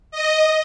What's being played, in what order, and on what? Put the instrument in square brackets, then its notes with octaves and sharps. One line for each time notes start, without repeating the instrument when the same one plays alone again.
[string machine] D#5